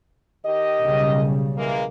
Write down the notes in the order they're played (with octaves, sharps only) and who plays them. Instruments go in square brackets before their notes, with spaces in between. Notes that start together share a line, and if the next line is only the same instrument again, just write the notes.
[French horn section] D#3 G4 D#5
[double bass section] B1 C#3 G3
[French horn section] E3 G#3 A#3